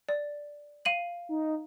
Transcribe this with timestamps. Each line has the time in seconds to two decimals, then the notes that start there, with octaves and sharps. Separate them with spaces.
0.09 D5
0.85 F5 D#7 F#7
1.29 D#4